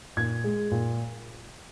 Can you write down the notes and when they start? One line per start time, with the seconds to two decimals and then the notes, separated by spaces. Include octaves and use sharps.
0.17 A#2 G#6
0.44 G#3
0.71 A#2